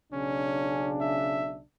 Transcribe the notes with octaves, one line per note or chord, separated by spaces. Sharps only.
B1 C#3 C#4 D4
E5